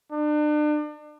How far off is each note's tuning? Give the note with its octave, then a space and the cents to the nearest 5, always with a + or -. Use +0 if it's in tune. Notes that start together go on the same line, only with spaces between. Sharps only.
D4 +35